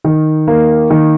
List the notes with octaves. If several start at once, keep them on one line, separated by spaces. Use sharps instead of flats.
D#3
A#3
D#3